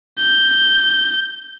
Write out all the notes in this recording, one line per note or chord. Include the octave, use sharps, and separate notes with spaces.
G6